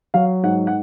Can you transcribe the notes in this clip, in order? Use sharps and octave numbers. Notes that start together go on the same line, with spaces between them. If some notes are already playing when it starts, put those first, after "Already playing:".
F#3 F5
G#2 F#5
F#5